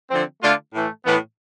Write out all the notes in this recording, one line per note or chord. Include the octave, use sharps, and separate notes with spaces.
D3 F3 C4
D3 A3 D4 F4
A2 E3 A3
A2 E3 B3